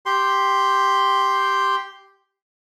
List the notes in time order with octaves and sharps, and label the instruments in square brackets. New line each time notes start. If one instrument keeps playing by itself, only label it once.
[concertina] G4 C6